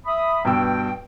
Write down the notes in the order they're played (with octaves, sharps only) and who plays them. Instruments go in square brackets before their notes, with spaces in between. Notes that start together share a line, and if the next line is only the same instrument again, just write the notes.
[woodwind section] E5 B5 D#6
[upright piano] G2 B2 E6 [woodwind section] G5